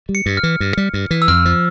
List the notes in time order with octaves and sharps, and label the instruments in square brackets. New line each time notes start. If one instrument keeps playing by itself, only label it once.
[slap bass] G3
[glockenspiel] C#7
[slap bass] G2
[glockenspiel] F6
[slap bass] E3
G2
G3
G2
E3
[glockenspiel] E6
[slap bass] F2 [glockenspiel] F6
[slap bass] F3